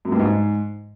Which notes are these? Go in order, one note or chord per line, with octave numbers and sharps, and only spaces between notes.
F#2
G2
G#2